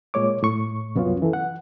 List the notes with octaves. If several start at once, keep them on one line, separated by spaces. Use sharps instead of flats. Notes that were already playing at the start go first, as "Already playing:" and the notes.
A#2 G#3 C#5 D6
A2 C#6
C2 F#2 B3 C#4 F4
E3 A4
F#5